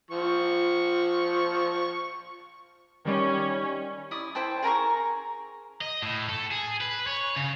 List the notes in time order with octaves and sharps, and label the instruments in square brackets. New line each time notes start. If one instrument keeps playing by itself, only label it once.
[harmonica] F3 C#6
[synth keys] D#3 G3 [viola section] C#4
[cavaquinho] E4 D5 D#6
E4 C5 G5 A5
G#4 A#4 A#5 C#6
[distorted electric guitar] D#5
A2
A4
G#4
B4
C#5
C#3